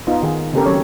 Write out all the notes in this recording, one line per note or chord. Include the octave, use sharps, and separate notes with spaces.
B3 D#4 F4
D#3 G#4
C#3 A#3 C4 G4 A4 A#4
D#3 F#3 C#4 A4 C#5